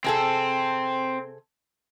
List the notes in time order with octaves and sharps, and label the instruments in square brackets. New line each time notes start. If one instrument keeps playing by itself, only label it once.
[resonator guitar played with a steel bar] C3 G#4 A4 [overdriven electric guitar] C4